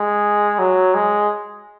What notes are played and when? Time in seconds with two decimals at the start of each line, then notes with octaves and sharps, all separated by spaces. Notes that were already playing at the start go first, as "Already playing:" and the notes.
Already playing: G#3
0.59 F#3
0.94 G#3